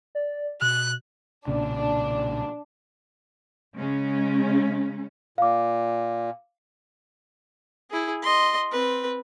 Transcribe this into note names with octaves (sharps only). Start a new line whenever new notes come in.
D5
B2 F#6
B1 A#2 C#3 D4
C#3 G#3 C#4
A#2 F5 D6
E4 G#4
D#5 C6
C4 B4